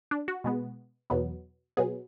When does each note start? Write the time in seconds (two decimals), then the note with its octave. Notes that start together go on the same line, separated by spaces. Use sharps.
0.11 D4
0.28 F#4
0.44 B2 G#3 B3
1.10 E2 B2 F#3 B3
1.77 B2 F#3 B3 G#4